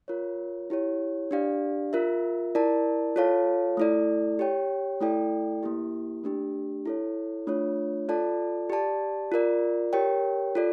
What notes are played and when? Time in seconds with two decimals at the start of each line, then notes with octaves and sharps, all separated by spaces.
0.08 F4 A#4 C#5
0.70 E4 G4 C#5
1.31 D4 G4 D5 F5
1.93 F4 A#4 E5
2.55 E4 A#4 D5 A5
3.16 F4 A4 C#5 F5 A5
3.77 A3 E4 A4 D5
4.39 G4 C#5 G5
5.01 A3 E4 A4 D5 G5
5.63 A#3 E4 G4
6.24 A3 D4 G4
6.86 E4 A4 C#5
7.47 A3 D4 F4 C#5
8.09 F4 A4 D5 A5
8.70 G4 D5 A5
9.32 F4 A#4 D5
9.93 G4 A#4 C#5 G5
10.55 F4 A4 D5